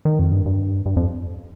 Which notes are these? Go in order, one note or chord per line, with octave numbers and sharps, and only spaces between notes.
D#3
F2
G2
G2
G2
F2